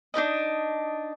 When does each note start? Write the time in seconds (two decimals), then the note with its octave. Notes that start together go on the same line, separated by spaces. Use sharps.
0.14 D4 D#4 B4 D#5